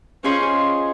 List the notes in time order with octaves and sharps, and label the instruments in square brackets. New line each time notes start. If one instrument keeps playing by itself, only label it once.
[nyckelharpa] C#4 [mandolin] F4 G#4 C5 D#5